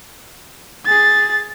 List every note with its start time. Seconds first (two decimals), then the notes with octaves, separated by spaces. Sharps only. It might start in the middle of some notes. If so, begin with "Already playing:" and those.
0.86 G#4 A6